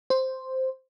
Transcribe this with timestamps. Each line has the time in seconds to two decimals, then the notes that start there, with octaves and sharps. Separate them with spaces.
0.10 C5